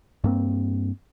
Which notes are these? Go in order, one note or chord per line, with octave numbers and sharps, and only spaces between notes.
G2 A#3 C4